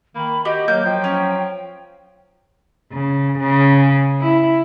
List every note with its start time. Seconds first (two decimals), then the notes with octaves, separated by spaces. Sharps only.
0.15 D#3 A#3 B5
0.45 F#4 G4 D#5
0.68 F#3 A#3 G6
0.85 F3 G5
1.04 C#4
2.92 C#3
3.39 C#3
4.21 E4